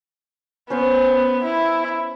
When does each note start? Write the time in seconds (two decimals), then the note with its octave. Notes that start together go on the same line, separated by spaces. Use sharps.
0.70 B3 C#4 C5
1.44 E4